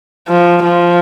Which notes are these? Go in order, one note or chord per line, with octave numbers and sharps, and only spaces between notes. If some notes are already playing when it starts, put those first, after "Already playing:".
F3
F3